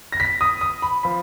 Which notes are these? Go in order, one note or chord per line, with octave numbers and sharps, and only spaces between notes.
A#6
B6
D#6
D#6
B5
F3 B5